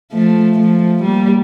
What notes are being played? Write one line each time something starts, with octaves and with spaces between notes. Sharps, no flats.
F3 A3
F3 A3
G3 A#3